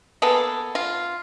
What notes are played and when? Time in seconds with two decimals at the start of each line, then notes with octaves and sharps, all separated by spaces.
0.22 A#3 B3 G#4 A4
0.75 F4